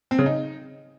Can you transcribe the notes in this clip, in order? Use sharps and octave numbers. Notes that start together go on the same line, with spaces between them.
C4
C#3
D#4